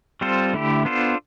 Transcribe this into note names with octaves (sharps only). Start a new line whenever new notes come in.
G3 C4 F4 A4 C5
D3 A3 E4 G4
B3 D4 F4 A4 C5